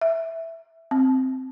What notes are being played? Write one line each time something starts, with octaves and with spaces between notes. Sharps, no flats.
E5
C4